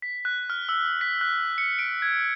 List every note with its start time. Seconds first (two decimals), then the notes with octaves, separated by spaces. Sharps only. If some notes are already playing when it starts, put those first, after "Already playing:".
0.02 B6
0.25 F#6
0.50 F6
0.69 E6
1.01 B6
1.21 F#6
1.58 C#7
1.79 D7
2.02 G#6